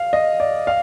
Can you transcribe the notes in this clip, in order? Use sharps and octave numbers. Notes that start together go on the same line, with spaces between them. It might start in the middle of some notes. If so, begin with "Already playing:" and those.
Already playing: F5
D#5
D5
F5